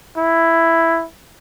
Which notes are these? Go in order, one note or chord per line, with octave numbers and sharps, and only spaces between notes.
E4